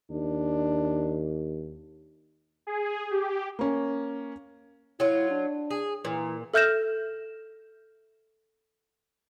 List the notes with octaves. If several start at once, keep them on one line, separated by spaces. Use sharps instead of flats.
D#2 D4
G#4
G4
A#3 C#4
F#3 E4 F4
D4
G#4
A#2 E3
A4 E5 F6 G6 A#6 E7